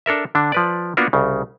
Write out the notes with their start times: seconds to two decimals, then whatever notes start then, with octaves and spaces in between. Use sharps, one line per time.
0.06 D4 A4 A#4 E5
0.35 D3 D4
0.52 F3 B4 D5
0.97 A#3 B3 D4 F4 F#4 A#4
1.13 C2 C#3